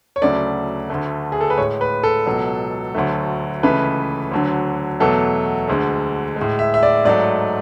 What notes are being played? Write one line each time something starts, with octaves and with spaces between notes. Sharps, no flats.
C#5
D2 C#3 F#3 A3 D5
D2 D3 A3
G#4
A4
B4
A2 G#3 C#5
B4
A4
C#2 B2 F#3
D2 D3 F#3 A3
C#2 C#3 E3 A3 B4
D2 D3 F#3
E2 B2 F#3 A3 A4
D2 D3 G#3
G#3
A2
E5
E5
D5
G#2 F#3 A3 D5